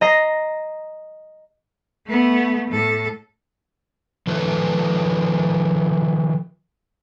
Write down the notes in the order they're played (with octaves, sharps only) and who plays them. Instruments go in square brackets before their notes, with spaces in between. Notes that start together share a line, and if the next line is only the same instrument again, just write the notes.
[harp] D#5 A#5 A#6 C7
[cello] A3 B3
A2 A4
[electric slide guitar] D#3 F3 A4 B4